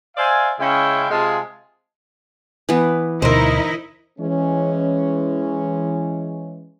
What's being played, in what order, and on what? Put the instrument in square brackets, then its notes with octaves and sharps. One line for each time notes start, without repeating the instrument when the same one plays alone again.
[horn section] C5 D5 E5 F5 G#5
C#3 G#3 C#4 E4 G#4 G5
C3 G#3 F4 G#4 F5 A5
[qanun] E3 B3
[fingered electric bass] D2 B2 [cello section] D#4 E4 D#5 [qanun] A#4 C5
[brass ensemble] E3 G#3 C#4